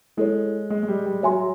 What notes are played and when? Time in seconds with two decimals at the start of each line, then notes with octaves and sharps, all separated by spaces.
0.17 G#3 E4 A4 C#5
0.70 G#3
0.83 G#3
0.88 G3
1.06 G3
1.23 F#3 C#5 E5 G#5 C6